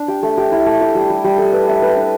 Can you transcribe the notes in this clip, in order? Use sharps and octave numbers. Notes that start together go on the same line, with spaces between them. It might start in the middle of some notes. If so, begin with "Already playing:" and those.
Already playing: D4
G4
A3
G4
E4
A3
G4
G3
G3
G3
A4
B4
E5
B4
D4